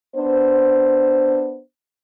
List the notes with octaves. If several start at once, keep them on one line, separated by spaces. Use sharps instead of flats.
B3 D4 C5